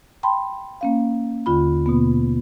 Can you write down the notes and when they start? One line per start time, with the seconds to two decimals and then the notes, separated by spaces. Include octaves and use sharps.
0.23 G5 A5 B5 C6
0.81 A#3 C#4 F5
1.46 D#2 D3 F4 B5
1.86 B2 A#3 B3